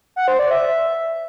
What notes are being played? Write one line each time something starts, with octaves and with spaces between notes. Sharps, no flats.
F#5
C5
D5
E5